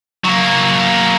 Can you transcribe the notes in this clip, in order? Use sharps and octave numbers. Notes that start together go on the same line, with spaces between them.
F#3 A#3